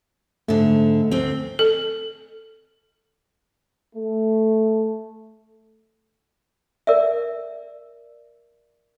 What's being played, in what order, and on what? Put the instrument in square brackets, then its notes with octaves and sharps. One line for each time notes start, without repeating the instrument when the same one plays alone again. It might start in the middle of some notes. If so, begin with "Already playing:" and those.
[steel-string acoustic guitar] G#2 D3 [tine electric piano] A3
[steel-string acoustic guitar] D2 C4
[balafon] A4
[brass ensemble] A3
[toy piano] A#4 D5 E5